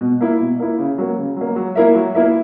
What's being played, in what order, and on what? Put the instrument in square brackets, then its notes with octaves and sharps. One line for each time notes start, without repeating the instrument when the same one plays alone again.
[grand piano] B2
A#3 E4
B2
A#3 E4
C#3
F#3 A#3
C#3
F#3 A#3
F#3
A#3 E4 A#4 E5
F#3
A#3 E4 A#4 E5